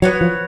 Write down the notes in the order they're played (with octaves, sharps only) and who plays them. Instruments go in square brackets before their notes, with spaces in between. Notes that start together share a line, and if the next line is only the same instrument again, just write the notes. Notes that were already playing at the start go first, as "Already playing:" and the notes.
[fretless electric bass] F#3 [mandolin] B3 F#4 C#5
[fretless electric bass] F3